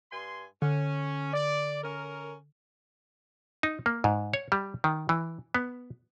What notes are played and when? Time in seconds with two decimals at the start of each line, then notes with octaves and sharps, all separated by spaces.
0.12 G2 G#5 C6
0.62 D3 C#4
1.33 D5
1.84 C#4 A#4
3.63 D#4
3.86 A#3
4.04 G#2
4.34 C#5
4.52 G3
4.84 D#3
5.09 E3
5.54 B3